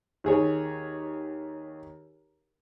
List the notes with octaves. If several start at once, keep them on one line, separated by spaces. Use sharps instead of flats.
D#2 G#4 C#5